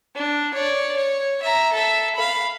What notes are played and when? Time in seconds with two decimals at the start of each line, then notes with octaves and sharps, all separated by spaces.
0.15 D4
0.54 C#5 D5
0.96 C#5
1.42 E5 A#5
1.72 A4 E5
2.16 F5 B5